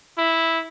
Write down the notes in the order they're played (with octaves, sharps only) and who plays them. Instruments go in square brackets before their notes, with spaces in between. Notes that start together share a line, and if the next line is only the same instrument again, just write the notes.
[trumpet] E4